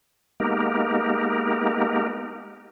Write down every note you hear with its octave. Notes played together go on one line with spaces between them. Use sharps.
G#3 A#3 B3 D#4 G4 A#4